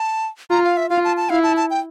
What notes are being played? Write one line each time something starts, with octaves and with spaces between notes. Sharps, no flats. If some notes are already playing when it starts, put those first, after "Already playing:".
Already playing: A5
F4 A#5
F5
E5
F4 F5
A5
A5
E4 F5
A5
A5
G5